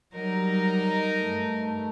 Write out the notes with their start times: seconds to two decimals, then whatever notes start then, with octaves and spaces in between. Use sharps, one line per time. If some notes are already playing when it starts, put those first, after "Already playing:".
0.14 F#3 G3 D#4 A#4
1.19 G2 A3